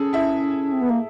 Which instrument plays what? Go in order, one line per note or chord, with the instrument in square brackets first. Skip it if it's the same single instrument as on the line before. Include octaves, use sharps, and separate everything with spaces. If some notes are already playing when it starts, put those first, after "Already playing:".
Already playing: [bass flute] C#4 [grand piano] G#4 A4
[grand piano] E4 E5
[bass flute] C4
B3
A#3